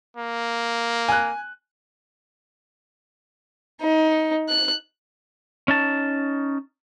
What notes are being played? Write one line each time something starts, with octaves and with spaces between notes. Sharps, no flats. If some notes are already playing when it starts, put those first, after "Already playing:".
A#3
G#5 F#6
D#4
F#6
C#4 D#4 A5